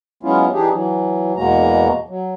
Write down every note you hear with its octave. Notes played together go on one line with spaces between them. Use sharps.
F#3 G#3 B3 C#4 E4 F4
E3 D4 D#4 G4 G#4
E3 F#3
E2 B2 G#3 A#3 F#4 A#5
F#3